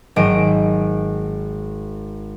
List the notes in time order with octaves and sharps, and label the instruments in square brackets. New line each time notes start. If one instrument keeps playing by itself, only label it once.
[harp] G#1 F#3 D#5 D7